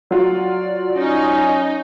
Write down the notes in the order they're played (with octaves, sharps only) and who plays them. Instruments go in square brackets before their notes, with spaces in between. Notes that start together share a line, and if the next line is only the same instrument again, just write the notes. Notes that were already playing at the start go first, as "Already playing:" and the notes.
[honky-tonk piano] F#3 F4 F#4 [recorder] D5
[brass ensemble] C#4 [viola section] D#4